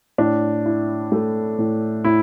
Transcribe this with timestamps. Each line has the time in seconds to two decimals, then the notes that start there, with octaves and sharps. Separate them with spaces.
0.18 A2 D4
0.66 E4
1.12 A3
1.59 A2
2.04 A2 E4